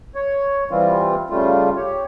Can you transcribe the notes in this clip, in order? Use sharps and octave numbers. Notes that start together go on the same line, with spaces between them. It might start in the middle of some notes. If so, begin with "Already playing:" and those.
C#5
E3 G3 C4 F4
C#3 G3 A3 F4
G4 C#5